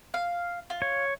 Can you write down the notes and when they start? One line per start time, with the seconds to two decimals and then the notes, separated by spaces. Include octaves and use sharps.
0.14 F5
0.70 F4
0.82 C#5